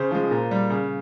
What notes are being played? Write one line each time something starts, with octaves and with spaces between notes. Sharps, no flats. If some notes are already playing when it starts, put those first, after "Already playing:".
Already playing: C#3 C5
F3 G#3
A#2
G3
C#3